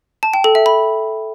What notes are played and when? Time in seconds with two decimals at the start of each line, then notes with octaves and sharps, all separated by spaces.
0.23 A5
0.34 G5
0.44 A4
0.55 E5
0.66 B5